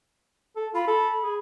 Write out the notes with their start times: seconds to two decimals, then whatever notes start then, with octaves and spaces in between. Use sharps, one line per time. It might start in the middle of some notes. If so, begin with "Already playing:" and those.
0.56 A4
0.74 F4 B5
0.88 A4
1.24 G#4